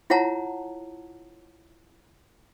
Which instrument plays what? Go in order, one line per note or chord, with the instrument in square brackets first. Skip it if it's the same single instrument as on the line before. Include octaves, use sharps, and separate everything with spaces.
[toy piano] E4 F4 C#5 F#5 A5 A#5